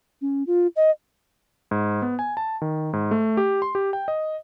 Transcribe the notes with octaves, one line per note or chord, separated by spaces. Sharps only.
C#4
F4
D#5
G#2
B3
G#5
A5
D#3
G#2
A3
G4
C6
G4
G5
D#5